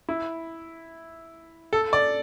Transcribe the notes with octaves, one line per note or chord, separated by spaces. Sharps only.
E4
A4
D5